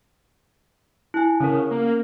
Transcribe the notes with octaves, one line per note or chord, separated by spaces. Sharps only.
E4 G#5
C#3 C#4 A#4
A#3